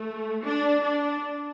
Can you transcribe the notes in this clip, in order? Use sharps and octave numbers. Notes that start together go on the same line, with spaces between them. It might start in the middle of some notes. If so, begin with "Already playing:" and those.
Already playing: A3
D4
D4